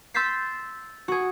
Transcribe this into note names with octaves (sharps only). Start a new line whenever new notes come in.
C6 E6 G6 A6 B6 C7
F#4 G#4